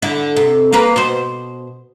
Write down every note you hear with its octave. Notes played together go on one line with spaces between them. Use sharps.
D3 E4
C3
A#3 A#4 B4
B2 C5